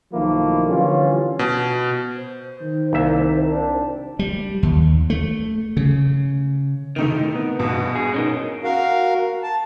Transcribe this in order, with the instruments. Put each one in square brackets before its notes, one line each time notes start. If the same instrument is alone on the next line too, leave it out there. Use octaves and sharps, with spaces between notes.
[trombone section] B1 D#3 F3 A3 A#3 E4
D3 E3 G3 C#4 F4
[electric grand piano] B2
[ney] C5
[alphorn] D#3
[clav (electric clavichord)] C2 E5 [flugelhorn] A#3
[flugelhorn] D4
[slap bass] G3
D#2
A3
C#3
[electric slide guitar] A2 C3 D#3 [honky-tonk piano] A3 D#4 F7
[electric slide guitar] B3
[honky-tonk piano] A#1 G2 B2
[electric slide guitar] G#4
C#4 D#4 A#4
[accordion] F#4 A#4 F5
A5